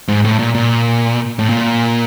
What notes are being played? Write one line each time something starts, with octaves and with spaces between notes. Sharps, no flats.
G#2
A2
A#2
A#2
A2
A#2